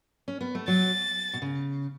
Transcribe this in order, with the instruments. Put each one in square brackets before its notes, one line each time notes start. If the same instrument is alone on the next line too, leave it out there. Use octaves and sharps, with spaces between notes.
[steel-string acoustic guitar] C#4
B3
A3
[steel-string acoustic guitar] F#3 [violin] A6
[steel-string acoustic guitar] B2
C#3